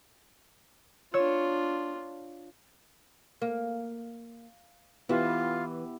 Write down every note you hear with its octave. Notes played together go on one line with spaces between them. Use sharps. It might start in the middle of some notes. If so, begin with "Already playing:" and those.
D4 F4 C#5 E6
A#3
E3 B3 E4 F4 G4